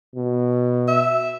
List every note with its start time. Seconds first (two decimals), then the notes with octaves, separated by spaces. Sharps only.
0.16 B2
0.88 E5